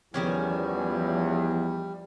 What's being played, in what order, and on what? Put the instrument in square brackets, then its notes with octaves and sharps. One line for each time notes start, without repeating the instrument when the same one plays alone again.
[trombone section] E2 [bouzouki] D#3 C#4 G#5 [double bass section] F3 [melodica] G3